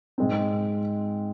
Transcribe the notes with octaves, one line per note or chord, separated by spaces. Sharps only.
G#2 G#3 C4